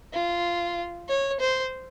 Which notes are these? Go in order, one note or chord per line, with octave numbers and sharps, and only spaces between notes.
F4
C#5
C5